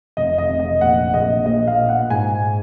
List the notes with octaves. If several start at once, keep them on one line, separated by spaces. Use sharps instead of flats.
F1 D#5
D#5
F1
D#5
A#1 F#5
A#1 D#5
A#1 D#5
F5
A#2
F#5
G#2 G#5